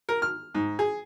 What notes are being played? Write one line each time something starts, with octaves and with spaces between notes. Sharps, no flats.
A#4
F6
G#2
G#4